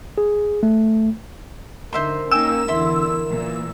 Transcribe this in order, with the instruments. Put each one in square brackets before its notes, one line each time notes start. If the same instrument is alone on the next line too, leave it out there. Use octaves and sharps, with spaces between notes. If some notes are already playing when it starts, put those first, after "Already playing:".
[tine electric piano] G#4
A3
[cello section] D3 D#4 [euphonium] A#4 [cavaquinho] C5 E5 C6
[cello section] A#3 C#4 D#4 [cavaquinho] G5 G#5 [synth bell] E6
[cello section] E2 D3 E4 [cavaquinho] E5 C6
[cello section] A#2 E3